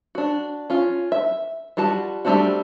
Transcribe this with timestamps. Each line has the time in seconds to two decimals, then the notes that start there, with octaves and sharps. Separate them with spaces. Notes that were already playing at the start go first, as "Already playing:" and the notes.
0.15 D4 F#4
0.70 C#4 F4
1.12 E5
1.77 G3 F4 F#4 A5
2.25 G3 A3 C4 D4 F#4